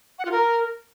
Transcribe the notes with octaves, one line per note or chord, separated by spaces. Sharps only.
F#5
F4
A#4